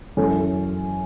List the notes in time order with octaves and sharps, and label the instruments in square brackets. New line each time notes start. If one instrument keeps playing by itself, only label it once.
[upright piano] F#2 E3 C#4 A4